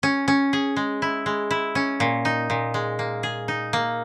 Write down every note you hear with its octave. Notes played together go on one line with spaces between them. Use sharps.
C#4
C#4
G#4
G#3
E4
G#3
E4
C#4
A#2
D#4
A#2
G#3
A#3
G#4
D#4
A#3